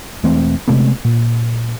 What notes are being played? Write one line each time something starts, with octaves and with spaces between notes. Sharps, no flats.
E1 E3 A3 C4
C3 G#3 A3 B3
A#2